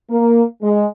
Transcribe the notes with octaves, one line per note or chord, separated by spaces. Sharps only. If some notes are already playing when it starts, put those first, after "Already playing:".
A#3
G#3